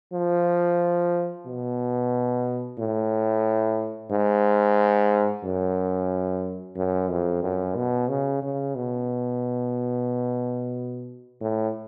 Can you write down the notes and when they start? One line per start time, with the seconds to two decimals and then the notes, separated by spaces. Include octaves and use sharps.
0.13 F3
1.46 B2
2.79 A2
4.11 G#2
5.44 F#2
6.76 F#2
7.10 F2
7.43 F#2
7.76 B2
8.09 C#3
8.42 C#3
8.75 B2
11.41 A2